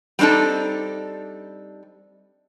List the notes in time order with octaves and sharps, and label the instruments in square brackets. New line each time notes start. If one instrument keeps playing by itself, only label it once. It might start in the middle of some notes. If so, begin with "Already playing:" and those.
[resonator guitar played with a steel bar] G3 C4 D4 D#4 A4